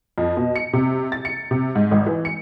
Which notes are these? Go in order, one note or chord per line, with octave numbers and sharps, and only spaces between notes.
F2
B2
C#7
C3
A6
C#7
C3
G#2
G#1
E3
C#7